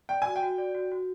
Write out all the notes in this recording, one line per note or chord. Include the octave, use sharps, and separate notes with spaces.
D5 G5
F#4 G#5
G5
F#4
D5
F#4
F#4